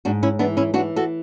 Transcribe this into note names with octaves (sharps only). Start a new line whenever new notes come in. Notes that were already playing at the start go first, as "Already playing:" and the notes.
G#2 D4 F#4
C#4 E4
E3 B3 D4
C#4 E4
E3 D4 F#4
F#4 A4